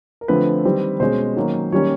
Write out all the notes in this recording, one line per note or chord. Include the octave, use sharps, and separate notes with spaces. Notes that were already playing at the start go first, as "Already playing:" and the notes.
A#4
D3 F3 A3 C4 B4
D#3 G3 C4
B2 G#3 C#4 C5
D#3 F#3 A#3 C#4
D#3 G3 A#3 C#4 C#5